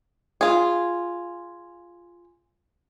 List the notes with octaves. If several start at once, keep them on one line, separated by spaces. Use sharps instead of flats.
F4 G#4